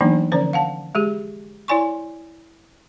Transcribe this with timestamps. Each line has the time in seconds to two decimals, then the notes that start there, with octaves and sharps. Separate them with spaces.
0.01 E3 F#3 A#3 B3 D4 D#4
0.32 D3 F3 C#4 C5 D5
0.53 F5 F#5 A5
0.95 G#3 G4 G#4
1.68 E4 C#5 D5 G#5 C6 C#6